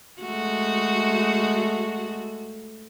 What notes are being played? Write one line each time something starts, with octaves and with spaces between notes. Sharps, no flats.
G#3 A3 F#4